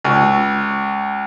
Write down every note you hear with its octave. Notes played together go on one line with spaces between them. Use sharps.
C#2